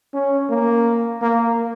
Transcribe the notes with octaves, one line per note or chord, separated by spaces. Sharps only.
C#4
A#3
A#3